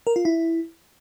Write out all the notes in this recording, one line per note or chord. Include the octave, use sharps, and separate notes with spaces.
A#4
F4
E4